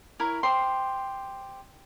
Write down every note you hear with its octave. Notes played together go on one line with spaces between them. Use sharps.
E4 A#4 C#5
G4 C5 C6